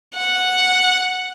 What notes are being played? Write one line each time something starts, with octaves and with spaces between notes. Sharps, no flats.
F#5